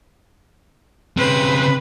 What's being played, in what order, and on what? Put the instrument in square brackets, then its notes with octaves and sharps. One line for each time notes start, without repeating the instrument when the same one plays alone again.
[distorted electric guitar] C#3 C4 [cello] B4